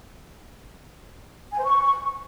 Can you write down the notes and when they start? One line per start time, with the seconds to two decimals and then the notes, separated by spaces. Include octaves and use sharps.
1.52 G#5
1.58 C5
1.64 C#6